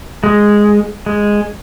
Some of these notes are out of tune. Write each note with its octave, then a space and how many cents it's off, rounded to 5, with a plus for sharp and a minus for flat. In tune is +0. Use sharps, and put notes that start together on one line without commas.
G#3 +0
G#3 -5